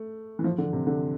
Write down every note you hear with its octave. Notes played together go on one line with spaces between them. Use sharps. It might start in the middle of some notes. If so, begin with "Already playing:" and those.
Already playing: A3
E3
F3
D3
C3
D3